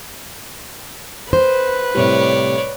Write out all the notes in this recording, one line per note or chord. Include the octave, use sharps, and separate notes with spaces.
B4 C5
A2 C3 G3 C#5 D5